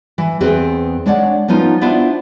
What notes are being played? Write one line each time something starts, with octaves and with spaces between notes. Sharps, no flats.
E3
E2 C4 G#4 B4
G#3 D4 C#5 D5 F#5
F3 B3 C#4 D#4 F4
B3 D4 E4 F4 C5 E5